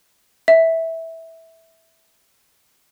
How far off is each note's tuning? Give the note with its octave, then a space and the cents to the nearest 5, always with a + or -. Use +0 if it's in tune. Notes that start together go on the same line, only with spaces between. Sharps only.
E5 -10